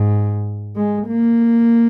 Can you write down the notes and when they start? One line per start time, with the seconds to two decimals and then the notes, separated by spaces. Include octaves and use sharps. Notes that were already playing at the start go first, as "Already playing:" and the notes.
Already playing: G#2
0.76 G#3
1.07 A#3